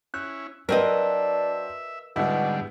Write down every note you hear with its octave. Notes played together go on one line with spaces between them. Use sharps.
C#4 E4 F#6
F#3 C4 D4 A#4 B4 D#5 E5
G#2 B2 D3 G3 B3 E4